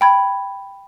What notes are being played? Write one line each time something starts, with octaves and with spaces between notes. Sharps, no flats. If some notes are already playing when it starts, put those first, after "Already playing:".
G5 B5 G#6